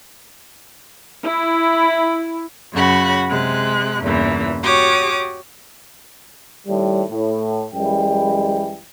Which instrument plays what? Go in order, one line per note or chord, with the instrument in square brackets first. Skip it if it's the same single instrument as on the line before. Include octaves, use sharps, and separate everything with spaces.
[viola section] E4
[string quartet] F#2 C#3 F#4 B5
C3 G#3 F#6
E2 G2 A#2 C#3 E3
F#4 G4 C#5 D6 D#6
[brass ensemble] D#2 A2 G3
A2
F#2 E3 G3 G#3 G5